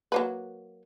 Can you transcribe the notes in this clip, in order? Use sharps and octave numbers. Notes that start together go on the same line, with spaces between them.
F#3 A#3 B4